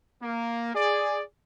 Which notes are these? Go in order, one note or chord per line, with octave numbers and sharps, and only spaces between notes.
A#3
G#4 D5